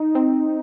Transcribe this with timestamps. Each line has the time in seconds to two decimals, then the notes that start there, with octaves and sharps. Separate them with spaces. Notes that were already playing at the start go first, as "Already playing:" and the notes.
Already playing: D#4
0.15 C4